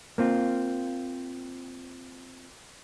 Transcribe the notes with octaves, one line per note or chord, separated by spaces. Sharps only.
A#3 C4 F4